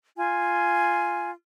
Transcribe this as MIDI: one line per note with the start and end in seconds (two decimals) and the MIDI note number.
0.16 1.29 65
0.16 1.29 80